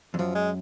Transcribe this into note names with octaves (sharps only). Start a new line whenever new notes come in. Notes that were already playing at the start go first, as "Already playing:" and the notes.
F2
F#2 F3
G#3